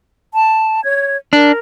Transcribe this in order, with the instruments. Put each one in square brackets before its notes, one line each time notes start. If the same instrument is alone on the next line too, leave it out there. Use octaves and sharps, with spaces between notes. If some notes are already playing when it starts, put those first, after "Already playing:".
[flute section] A5
C#5 G#6
[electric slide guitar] D4 [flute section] A#4